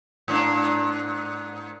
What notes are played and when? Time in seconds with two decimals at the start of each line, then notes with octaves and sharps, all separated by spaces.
0.28 G#2 A#3 D4